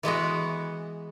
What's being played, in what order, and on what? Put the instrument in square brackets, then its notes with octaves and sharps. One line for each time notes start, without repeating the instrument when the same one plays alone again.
[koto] E3 G#3 B3 F#4